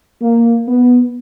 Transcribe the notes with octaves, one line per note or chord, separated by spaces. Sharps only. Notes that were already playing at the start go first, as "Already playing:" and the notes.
A#3
B3